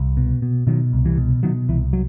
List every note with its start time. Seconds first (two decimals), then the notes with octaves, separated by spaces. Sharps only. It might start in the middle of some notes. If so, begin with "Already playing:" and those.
Already playing: C2
0.17 B2
0.42 B2
0.67 B2 D#3 F#3
0.93 C2
1.05 E3 G3
1.17 B2
1.43 B2 D#3 F#3
1.69 C2 E3
1.93 F#3